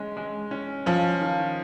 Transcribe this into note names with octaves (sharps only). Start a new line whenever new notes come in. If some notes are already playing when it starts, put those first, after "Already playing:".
Already playing: G#3 C#4
G#3
C#4
F3 C#4
D#3